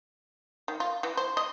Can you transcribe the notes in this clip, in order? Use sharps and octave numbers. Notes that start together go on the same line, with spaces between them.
D#3
F4
E3
C5
D#5